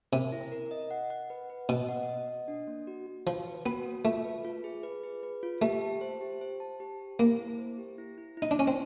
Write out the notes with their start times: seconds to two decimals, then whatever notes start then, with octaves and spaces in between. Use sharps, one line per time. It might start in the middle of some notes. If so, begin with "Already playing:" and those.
0.12 C3 A#4
0.32 E4
0.52 A#4
0.71 D#5
0.91 F#5
1.10 F#5
1.30 B4
1.50 B4
1.69 B2 D#5
1.88 F#5
2.08 D#5
2.28 D#5
2.48 D4
2.67 A#3
2.87 F#4
3.07 F#4
3.27 F3 B4
3.46 B4
3.65 B3 F#4
3.86 A#3
4.05 A3 F4
4.25 B4
4.45 F4
4.64 G#4
4.83 B4
5.03 G#4
5.23 B4
5.43 F4
5.62 A3 G4
5.82 A5
6.01 C5
6.21 G4
6.41 C5
6.60 A5
6.80 G4
7.00 G4
7.19 A#3 E4
7.39 E4
7.58 C5
7.78 G4
7.98 E4
8.18 E4
8.37 E4
8.42 D#4
8.51 D4
8.57 C#4 E4
8.67 C4